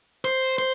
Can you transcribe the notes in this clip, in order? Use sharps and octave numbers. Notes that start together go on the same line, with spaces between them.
C5
C5